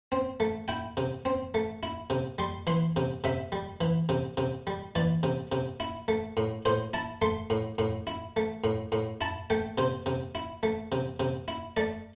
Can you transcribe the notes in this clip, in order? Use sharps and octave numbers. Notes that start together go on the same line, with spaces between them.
C4
A3
E4 G5
C3
C4
A3
E4
C3
G3 C6
E3 C6
C3
C3 E5
G3
E3
C3
C3
G3
E3 D5
C3
C3
E4
A3
A2
A2 C5
E4 A5
A3 C6
A2
A2
E4
A3
A2
A2
E4 A5
A3 G5
C3 C5
C3
E4
A3
C3
C3
E4
A3 D5